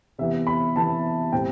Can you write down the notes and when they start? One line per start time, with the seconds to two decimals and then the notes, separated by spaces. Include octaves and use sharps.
0.18 C3 E3 B3 E5
0.47 B5
0.75 C3 E3 B3 A5
1.32 A2 G3 C4 G5